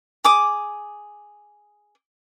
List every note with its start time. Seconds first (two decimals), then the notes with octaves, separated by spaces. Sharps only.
0.24 G#4 D6 D#6